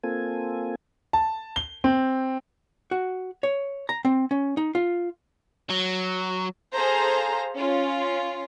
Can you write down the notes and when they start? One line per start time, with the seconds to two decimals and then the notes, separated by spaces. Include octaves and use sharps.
0.04 A#3 C4 F4 A4 G#5
1.13 A5
1.56 G7
1.84 C4
2.91 F#4
3.43 C#5
3.89 A#5
4.05 C4
4.31 C#4
4.57 D#4
4.75 F4
5.70 F#3
6.75 G#4 A4 C5 F5 A#5
7.55 C#4 F4